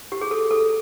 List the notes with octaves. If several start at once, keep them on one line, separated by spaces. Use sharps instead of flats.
G4
G#4
A4
A4